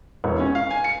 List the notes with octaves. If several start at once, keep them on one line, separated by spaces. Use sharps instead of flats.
E1
C#4
F5
G#5
C#7